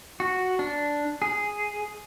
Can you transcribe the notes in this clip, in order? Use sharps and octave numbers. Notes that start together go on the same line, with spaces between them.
F#4
D4
G#4